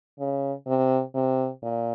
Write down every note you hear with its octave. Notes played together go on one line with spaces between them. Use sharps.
C#3
C3
C3
A#2